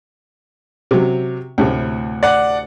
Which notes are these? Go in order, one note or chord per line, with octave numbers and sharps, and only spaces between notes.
C3 F#3
D2 A2 C3
D5 F#5